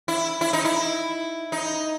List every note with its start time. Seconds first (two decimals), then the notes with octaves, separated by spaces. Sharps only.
0.08 E4
0.41 E4
0.53 D#4
0.65 E4
1.52 D#4